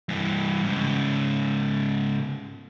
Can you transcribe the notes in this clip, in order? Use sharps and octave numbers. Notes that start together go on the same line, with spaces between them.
G2 E3
G#2 C#3